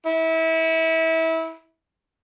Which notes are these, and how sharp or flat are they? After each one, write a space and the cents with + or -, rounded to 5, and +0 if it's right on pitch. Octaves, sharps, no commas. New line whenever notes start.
E4 -25